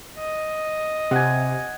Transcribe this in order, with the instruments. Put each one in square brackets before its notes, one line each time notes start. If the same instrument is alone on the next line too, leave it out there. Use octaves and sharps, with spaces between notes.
[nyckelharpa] D#5
[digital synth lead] C3 [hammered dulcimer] F#5 G#5